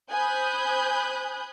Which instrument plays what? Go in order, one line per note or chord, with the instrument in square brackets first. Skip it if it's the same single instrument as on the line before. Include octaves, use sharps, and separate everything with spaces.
[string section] C5 G#5 B5 D#6 F#6 G6